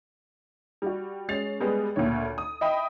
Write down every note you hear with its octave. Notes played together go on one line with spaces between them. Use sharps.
G3 F#4
G#3 C#4 A6 C7 F7
G3 G#3 B3
D2 A#2 D3 C#5
D#6
D#5 E5 G5 B5